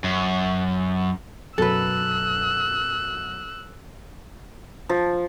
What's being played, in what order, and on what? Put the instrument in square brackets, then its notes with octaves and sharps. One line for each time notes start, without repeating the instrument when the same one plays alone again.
[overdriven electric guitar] F#2
[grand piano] F#2 B2 F#3 [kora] A4 B4 [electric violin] E6 F#6
[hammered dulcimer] F3